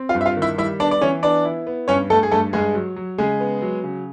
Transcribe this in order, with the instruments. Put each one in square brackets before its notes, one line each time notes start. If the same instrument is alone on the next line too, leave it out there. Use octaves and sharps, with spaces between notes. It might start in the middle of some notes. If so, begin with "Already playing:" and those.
Already playing: [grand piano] C4
F4 F5
G2
E5
F4 F5
D#3
E4 E5
G3 E4 E5
B3 D4 D5
D5
E3 C#4 C#5
B3 D4 D5
E4
B3
G2 C#4 C#5
G2 A3 A4
G#4
G2 A3 A4
G2 G#3 G#4
F#3
F#3
C#3 G#3 G#4
B3
F#3
C#3